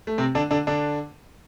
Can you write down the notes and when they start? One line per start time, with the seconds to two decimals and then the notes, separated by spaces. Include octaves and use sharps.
0.07 A3
0.18 C3 C4
0.35 D3 D4
0.51 D3 D4
0.67 D3 D4